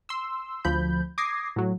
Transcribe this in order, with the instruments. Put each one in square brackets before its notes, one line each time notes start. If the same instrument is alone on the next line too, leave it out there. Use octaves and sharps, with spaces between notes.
[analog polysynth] C6 E6
D2 F3 B5 G6
D6 D#6 G#6 A#6 C7
A2 F#3